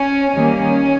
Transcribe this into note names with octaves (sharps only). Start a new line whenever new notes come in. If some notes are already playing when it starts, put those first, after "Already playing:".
Already playing: C#4
D#3 G3 A#3 C#4